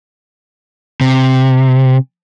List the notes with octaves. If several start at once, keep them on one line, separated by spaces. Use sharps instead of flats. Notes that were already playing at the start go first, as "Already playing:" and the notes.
C3